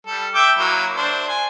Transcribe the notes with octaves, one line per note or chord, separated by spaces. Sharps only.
G3 A4
E5 G5 D6
F#3 A#3 E4
D4 C5
G#5